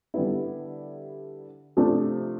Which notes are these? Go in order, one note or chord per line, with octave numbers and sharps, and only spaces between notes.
D3 G3 B3 E4
C3 F3 A3 D4 G4